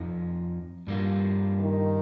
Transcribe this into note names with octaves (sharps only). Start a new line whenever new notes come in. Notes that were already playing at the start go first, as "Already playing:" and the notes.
Already playing: F2 F3 D#4
G2 G3 A#3 F4
D#3